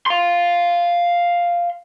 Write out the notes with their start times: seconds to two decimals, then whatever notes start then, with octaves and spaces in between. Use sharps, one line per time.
0.06 F5 C6